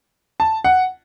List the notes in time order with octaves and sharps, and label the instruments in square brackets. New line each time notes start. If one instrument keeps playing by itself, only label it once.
[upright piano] A5
F#5